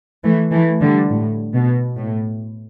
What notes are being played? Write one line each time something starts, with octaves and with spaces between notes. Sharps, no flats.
E3 A3
E3 A3
D3 G3
A2
B2
A2